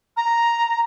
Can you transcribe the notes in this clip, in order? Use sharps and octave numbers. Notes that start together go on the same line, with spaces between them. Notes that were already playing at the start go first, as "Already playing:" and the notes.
A#5